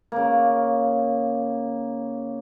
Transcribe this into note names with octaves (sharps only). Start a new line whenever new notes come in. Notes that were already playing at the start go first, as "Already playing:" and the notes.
C#3 A#3